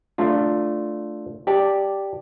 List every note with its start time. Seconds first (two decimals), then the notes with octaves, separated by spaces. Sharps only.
0.18 A3 D4 F4
1.47 G4 D5 A5